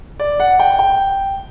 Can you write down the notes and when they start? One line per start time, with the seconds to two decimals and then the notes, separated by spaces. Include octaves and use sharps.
0.20 D5
0.40 F#5
0.60 G5
0.79 G5